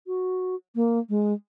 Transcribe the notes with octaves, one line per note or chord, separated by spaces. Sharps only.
F#4
A#3
G#3